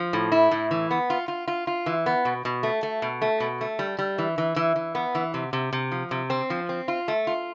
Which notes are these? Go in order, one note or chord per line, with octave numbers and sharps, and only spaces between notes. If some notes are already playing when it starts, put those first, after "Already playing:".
Already playing: F3
A2
E4
A2
E3
B3
F4
F4
F4
F4
E3
B3
B2
B2
A3
A3
B2
A3
B2
A3
G3
G3
E3
E3
E3
E3
B3
E3
C3
C3
C3
F3
C3
C4
F3
C4
F4
A3
F4